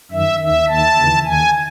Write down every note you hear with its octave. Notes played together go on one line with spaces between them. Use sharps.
F#2 D#3 E5
D#2 D#3 E5
D#2 D#3 A5
D#2 C#3 E3
D#2 D#3 G#5